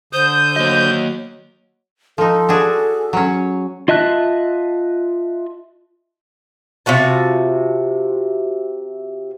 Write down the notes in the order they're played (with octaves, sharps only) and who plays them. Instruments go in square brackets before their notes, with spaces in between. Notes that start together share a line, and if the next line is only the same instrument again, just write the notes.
[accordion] D3 D#6 G6 [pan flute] C5
[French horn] F#3 [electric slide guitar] A#3 D#5
[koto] F3 D#4 [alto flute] A4
[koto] D4 F#4 G#4
F#3 C#4
[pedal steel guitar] F4 D#5 E5 A5 F#6
[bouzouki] C3 F4 F#4 A5